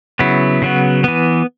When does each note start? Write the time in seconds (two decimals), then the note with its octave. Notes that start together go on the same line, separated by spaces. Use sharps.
0.19 C#3 F#3 B3 E4
0.62 C#3 F#3 B3
1.04 E3 B3